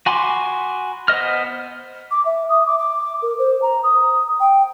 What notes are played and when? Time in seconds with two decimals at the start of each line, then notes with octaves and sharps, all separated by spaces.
0.06 F#4 G#5 B5 C6 D6
1.08 B3 C5 D#5 F6
2.11 D6
2.25 E5
2.49 D#6
2.66 D6
2.78 D6
3.22 A#4
3.39 C5
3.62 A#5
3.83 D#6
4.40 G5